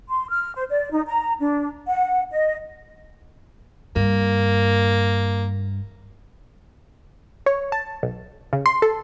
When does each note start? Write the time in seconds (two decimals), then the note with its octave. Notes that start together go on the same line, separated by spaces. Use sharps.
0.09 C6
0.30 F6
0.55 C5
0.70 D5
0.91 D#4
1.07 A#5
1.40 D4
1.88 F#5
2.32 D#5
3.96 G2 A#3
7.46 C#5
7.72 A5
8.03 B1
8.53 C#3
8.66 C6
8.82 A4